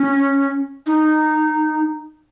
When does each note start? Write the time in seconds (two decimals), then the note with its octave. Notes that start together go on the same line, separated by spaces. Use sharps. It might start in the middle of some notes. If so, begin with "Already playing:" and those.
Already playing: C#4
0.86 D#4